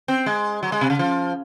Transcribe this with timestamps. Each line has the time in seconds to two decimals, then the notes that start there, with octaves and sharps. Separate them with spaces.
0.08 C4
0.26 G#3
0.63 F#3
0.72 G#3
0.81 C3
0.90 C#3
0.99 F3